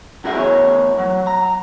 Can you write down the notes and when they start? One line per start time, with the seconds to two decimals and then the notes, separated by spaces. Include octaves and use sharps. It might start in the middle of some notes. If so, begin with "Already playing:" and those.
0.24 F#2 C#3 F#4 G#4 E5
0.37 E2 C#5
0.98 F#3
1.27 A#5